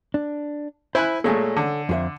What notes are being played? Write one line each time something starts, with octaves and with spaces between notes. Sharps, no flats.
D4
E4 C5 G#5 B5 F#6
A#2 G#3 A3 A4 C#5 G#5
D3
F2 G#4 E5